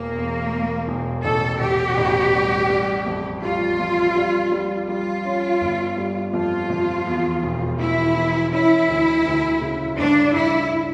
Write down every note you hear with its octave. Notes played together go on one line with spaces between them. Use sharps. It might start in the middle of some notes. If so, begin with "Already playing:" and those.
Already playing: E1 A#3
E2
E2
E1
A1 A4
A1 G4
A1
G3
G3
F2
G3 F4
F2
G3
G3
G3 F4
C#4
G1
G3
F2 F4
F2
E2
E1
E3 E4
E3
C#4 E4
D2
D2
C#3
G2 D4
G2 E4